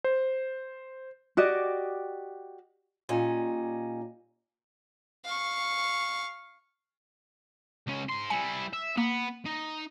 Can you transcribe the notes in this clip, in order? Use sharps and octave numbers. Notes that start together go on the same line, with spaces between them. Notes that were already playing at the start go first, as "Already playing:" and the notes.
C5
F#4 G4 D5 D#5
A#2 G3 C#4 D#4
F5 C#6
C#2 C#4
G#2 C6
G3 E4 G#5 C#7
E5
A#3 B3
D#4